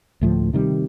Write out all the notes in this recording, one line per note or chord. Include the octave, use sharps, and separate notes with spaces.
D2 A2 F3
C3 D#3 G3